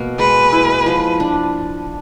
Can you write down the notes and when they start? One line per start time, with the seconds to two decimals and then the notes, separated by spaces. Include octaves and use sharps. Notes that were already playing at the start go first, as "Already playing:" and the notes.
Already playing: B2 A#3
0.19 G#3 B4
0.52 E4
0.86 F3
1.20 D4